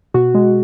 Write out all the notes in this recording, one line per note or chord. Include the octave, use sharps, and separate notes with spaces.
B2 F#4
G#3